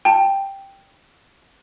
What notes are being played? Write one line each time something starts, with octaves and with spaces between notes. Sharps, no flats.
G5 A5